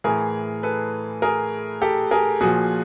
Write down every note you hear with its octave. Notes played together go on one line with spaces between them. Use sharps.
A2 E3 G#4 A#4
A4 B4
G#4 A#4
G4 A4
G#4 A#4
A#2 F3 F#4 G#4